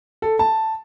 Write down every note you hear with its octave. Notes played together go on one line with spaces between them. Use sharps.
A4
A5